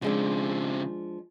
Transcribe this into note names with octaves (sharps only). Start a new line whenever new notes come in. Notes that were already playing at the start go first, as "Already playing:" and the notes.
C#3 F3 G#3 C4 D4